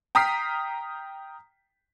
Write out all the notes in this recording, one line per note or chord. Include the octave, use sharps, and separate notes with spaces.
G5 A#5 D#6 F6 B6 C7